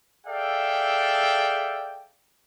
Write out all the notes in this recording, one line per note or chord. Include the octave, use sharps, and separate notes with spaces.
G#4 A4 D5 E5 F5 G5